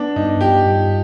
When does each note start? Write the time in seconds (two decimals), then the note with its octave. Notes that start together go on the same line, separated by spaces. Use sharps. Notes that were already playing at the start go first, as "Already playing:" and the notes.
Already playing: B3 D4
0.16 G2 D#4
0.41 F4 G4
0.65 G2